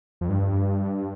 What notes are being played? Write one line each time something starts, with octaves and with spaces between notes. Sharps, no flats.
F2
G2